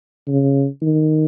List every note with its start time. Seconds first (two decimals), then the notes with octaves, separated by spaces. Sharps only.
0.28 C#3
0.82 D#3